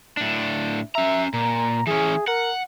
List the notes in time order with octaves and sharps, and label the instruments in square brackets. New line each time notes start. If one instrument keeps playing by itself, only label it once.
[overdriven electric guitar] A2 D4
[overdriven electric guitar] C#4 A#5 [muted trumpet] E5
[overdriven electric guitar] A#2 [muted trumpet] A#5
[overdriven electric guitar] E3 C#4 [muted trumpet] G#4
[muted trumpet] A#4 [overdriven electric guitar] F#5